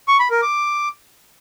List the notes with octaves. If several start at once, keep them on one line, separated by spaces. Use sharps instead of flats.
C#6
B5
A#4
D6